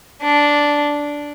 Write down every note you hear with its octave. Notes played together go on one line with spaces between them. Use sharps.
D4